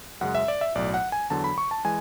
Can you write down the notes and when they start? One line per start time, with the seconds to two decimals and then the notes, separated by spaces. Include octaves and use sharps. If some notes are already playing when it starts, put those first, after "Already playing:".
0.21 F#2 C#3 G#3 F#5
0.35 E5
0.48 D5
0.61 E5
0.75 B1 A2 F#3 D5
0.94 F#5
1.12 G#5
1.30 E2 D3 F#3 A5
1.44 B5
1.58 C#6
1.71 A5
1.85 E3 G#3 G#5